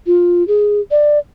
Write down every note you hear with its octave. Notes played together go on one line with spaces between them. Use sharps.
F4
G#4
D5